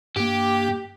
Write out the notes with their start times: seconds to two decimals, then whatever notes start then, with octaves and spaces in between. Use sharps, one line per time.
0.16 G2 A#3 G4